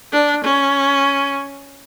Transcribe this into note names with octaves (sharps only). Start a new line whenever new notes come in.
D4
C#4